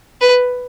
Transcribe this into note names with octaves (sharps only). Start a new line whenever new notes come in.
B4